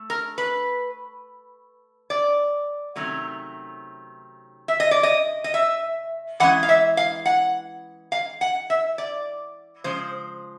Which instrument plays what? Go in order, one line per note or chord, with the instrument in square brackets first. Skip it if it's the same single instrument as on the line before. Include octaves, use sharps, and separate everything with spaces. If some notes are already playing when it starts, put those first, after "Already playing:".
Already playing: [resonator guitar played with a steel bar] A3
A#4
B4
D5
C3 D#3 F#3 A3 C#4
E5
D#5
D5
D#5
D#5
E5
E3 G#3 C#4 F#5
F5
E5
F5
F#5
F5
F#5
E5
D5
C#3 F3 G#3 C5